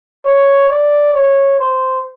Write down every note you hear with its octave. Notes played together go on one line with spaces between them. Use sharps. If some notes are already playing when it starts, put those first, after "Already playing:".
C#5
D5
C#5
C5